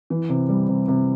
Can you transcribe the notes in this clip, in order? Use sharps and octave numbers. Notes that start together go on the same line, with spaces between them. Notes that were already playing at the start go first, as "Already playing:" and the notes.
E3
C3
G3
C3
C3